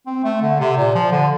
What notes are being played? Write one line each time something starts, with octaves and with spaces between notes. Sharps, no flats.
C4
A3
D3
C3
A#2
F3
D3